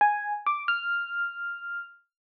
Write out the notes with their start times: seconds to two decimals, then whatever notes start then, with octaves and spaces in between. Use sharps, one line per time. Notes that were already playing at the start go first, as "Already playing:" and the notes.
0.01 G#5
0.47 D6
0.68 F6